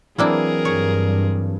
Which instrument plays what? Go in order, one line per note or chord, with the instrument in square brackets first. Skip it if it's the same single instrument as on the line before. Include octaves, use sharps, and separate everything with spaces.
[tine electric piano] E3 F#3 C4 [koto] A#3 D4 E4 [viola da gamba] G#4 A#4
[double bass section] G2 [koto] C#5